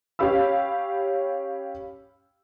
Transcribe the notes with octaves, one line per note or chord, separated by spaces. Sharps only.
C#4 G4 F5 B5 E6